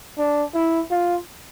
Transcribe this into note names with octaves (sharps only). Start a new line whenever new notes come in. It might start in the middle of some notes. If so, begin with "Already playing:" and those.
D4
E4
F4